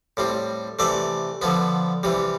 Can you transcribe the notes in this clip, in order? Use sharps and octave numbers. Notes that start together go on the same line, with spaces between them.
A2 G3 C4
C3 E3 A3 D5
D3 F3 B3
C3 E3 G3